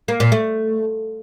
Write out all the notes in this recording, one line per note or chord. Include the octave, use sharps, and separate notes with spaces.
A#3
A#2
A3